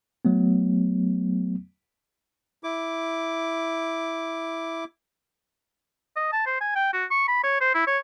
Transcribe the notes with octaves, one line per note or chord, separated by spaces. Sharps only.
F#3 A3 B3
E4 D6
D#5
A5
C5
G#5
G5
F#4
C#6
B5
C#5
C5
E4
C#5